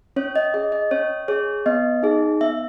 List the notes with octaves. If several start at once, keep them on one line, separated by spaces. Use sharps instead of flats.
C#4 C#5
D#5
G#4 D#5
D#5
C#4 C#5
G#4 C#5
B3 D#5
D#4 G#4
B3 E5